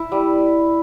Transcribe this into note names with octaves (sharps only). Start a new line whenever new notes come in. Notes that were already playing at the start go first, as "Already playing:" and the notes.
Already playing: E4 E5
G3